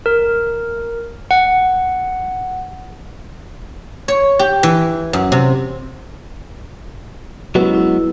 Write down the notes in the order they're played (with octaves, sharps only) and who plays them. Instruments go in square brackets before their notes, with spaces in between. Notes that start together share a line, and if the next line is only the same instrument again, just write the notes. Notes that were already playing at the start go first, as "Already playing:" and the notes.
[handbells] A#4
F#5
[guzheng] C#5
G4
E3
F#2
C3
[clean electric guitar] F#3 G#3 B3 [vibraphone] C#4 E4
[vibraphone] E4